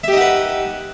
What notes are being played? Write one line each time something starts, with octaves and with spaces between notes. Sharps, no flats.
D#4 G4 B4 E5 F#5